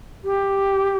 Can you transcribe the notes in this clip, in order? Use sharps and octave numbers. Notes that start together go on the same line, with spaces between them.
G4